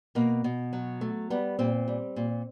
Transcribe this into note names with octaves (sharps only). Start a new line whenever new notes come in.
B2 A#3
B2
F#3
A3
G3 B3
A#2 C4
G3
A#2